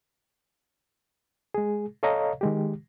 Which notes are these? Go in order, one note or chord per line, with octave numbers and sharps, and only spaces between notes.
G#3 G#4
A4 C#5 D#5 F5 A#5
D#3 G#3 G4